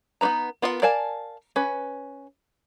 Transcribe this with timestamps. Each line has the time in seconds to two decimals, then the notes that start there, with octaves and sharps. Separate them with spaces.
0.21 B3 D#4 F#4 B4 A#5
0.62 B3 F4 A#4 D#5 F#5
0.82 A#4 D5 F5 G#5 A5
1.56 C#4 B4